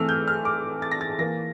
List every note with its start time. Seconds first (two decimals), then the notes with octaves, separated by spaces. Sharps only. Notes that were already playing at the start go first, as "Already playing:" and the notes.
Already playing: E3 A3 C4 E6 F6
0.09 G6
0.28 F6
0.45 D6
0.82 A6
0.91 A#6
1.01 A6
1.19 E3 A#3 A#6